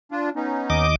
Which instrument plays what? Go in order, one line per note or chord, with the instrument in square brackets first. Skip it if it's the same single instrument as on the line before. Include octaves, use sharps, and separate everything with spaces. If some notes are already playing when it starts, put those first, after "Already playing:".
[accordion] D4 F4
B3 C#4 D#4
[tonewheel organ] D#2 D#5 D6